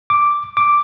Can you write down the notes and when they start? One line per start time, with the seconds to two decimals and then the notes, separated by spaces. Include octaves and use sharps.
0.10 D6
0.57 D6